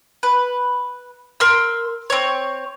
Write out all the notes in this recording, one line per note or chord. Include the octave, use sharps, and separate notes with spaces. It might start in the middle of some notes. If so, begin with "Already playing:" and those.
B4
A#4 C6 E6
C4 C#5